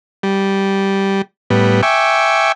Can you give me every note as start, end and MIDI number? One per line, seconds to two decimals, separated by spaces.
0.23 1.22 55
1.50 1.81 45
1.50 1.81 55
1.50 1.81 59
1.83 2.52 76
1.83 2.52 79
1.83 2.52 80
1.83 2.52 85
1.83 2.52 86